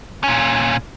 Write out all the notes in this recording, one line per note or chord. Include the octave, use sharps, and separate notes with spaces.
A#2 C#4